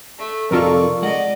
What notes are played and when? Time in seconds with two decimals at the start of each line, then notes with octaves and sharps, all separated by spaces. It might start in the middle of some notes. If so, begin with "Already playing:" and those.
0.18 A3
0.51 F2 C3 D#4 F4 A4 A#4 D5 C#6
1.02 G#3 D5 D#5 F#5